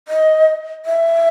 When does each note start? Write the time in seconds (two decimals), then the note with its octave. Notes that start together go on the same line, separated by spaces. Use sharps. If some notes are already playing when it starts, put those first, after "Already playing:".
0.08 D#5
0.86 E5